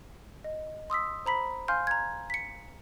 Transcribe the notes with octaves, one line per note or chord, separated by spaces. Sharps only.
D#5
C6 D#6 E6 B6
C5 A#5 B5 B6
F5 G#5 C6 F6 G6
A#5 G#6
B6 C#7